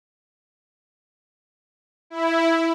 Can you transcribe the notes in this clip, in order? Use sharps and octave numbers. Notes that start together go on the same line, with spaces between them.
E4